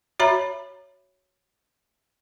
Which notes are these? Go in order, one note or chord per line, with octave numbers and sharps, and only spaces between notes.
F#4 C#5 E5 A#5 B5